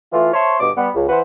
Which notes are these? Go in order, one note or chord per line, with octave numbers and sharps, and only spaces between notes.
E3 A3 F4
C5 C#5 E5 A5 C6 C#6
G2 B2 D3 D#5 D6
G3 B3
C#2
E3 B4 C5 F#5